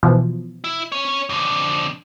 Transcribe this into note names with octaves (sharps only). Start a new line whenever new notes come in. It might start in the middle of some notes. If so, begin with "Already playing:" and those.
B2 E3 F3
E4
C#4 C#5
F2 D3